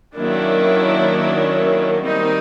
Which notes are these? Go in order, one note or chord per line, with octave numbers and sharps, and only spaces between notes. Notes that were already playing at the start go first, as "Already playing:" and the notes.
D#3 F#3 A#3 C#4 D4 E4
D#3 G3 C4 D#4